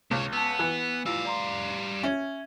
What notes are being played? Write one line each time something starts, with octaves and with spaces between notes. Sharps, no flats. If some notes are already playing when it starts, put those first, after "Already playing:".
C#2 C3 C#5
B3 A5 E6
E3 F#6
G3 E4 F4 F5 E6
D5 A#5 C6
C#4 E5 G#6